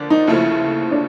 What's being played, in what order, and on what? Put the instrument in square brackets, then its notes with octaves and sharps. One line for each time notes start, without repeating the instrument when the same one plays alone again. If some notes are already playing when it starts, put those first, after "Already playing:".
Already playing: [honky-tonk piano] D3 F3 A#3 D4
[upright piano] D#4
[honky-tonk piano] D#2 C#3 F3 A3 [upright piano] E4
[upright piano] D4